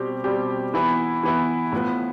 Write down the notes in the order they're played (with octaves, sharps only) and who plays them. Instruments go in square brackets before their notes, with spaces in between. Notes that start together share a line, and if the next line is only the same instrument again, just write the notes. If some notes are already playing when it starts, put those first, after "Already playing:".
Already playing: [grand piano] B2 G3 C4 G4
B2 G3 C4 G4
E3 B3 E4
E3 B3 E4
A2 F3 B3